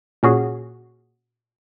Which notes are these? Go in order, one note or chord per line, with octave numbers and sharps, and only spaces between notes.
A#2 C#4 F#4 G#4